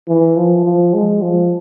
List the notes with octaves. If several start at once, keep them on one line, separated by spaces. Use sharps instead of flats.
E3
F3
F3
G#3
F3